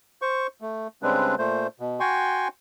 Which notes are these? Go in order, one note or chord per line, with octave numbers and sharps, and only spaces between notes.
C5 C#6
A3
C#3 G3 G#3 C4 D4 B4
A#2 A3 C5
B2
F#4 G5 G#5 C6 C#6